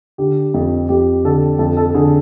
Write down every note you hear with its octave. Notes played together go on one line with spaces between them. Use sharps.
D3 G4
F2
F2 G4
D3 A4
F2 A4
A4
D3 G#4